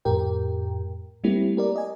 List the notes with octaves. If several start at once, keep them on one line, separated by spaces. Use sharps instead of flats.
F2 A2 G4 A#4 G5
G3 A3 A#3 C4 E4 G4
G4 A#4 D5
D#5 G#5